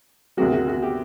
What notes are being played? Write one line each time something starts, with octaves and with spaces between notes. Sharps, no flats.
D2 C3 D#3 F#3 F#4
F#4
F#4
G4